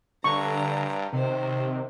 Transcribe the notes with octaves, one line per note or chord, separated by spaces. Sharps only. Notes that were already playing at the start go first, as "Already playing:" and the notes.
G2 D3 A#5 C#6
C3 D#3 C5